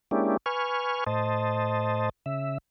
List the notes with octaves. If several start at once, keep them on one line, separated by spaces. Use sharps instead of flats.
G#3 A#3 C#4 D4 E4 G4
B4 G#5 C#6 F6
A2 C5 D#5 A5
C#3 E5